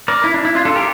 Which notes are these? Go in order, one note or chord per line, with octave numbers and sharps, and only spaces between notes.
A#4 D5
E4
D4
E4
D4 F4
F4 A4
G4 A#4